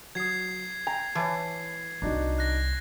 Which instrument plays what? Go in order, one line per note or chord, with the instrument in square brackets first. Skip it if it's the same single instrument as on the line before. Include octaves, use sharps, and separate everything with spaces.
[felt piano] F#3 D#6 [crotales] G#6 C7
[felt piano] G5 [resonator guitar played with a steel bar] A#5
[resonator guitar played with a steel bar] E3 [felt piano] C#5 A5
[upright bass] C2 C4 [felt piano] D4 D#4 F#4
[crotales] F#6 A#6